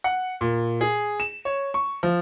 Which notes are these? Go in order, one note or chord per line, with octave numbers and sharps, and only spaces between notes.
F#5
A#2
G#4
E7
C#5
C#6
F3